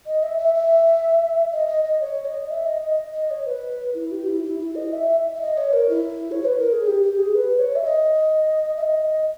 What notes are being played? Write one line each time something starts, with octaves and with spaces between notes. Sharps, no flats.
D#5
E5
E5
E5
D#5
D#5
D#5
C#5
D#5
E5
D#5
D#5
D#5
C#5
B4
E4
G4
E4
E4
E4
D#5
E5
E5
D#5
C#5
A#4
E4
C#5
B4
A#4
G#4
G4
G4
G#4
B4
C#5
E5
D#5
E5
D#5